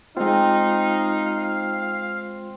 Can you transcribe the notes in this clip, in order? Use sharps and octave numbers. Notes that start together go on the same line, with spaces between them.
G#3 C4 D#4 F4 F5